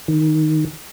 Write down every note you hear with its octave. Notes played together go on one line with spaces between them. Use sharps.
D#3